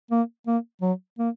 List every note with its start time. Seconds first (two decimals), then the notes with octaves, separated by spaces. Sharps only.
0.11 A#3
0.47 A#3
0.82 F#3
1.18 A#3